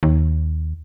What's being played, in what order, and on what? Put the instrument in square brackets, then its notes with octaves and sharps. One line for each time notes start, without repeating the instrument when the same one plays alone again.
[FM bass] D#2